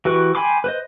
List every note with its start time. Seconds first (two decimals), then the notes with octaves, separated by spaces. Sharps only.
0.05 E3 F#4 G4 B4 C#6
0.35 G5 G#5 B5 C6 D6
0.64 B4 C5 D#5